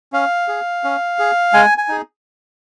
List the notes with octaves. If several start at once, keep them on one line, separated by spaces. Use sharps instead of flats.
C#4 F5
G#4
C#4
G#4
G#3 G#5
G#5
D#4 G#4